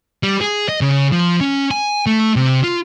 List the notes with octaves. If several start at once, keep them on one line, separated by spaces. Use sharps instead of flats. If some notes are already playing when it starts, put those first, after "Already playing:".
G3
G#4
D#5
C#3
F3
C#4
G#5
A3
C3
F4